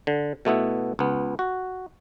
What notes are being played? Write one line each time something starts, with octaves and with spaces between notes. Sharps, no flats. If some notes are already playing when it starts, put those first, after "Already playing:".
D3
B2 A3 B3 E4
C#2 B3
F#4